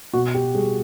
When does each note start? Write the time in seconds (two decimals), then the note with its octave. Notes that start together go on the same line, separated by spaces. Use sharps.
0.14 B2 F#4
0.34 G4
0.55 G3 G#4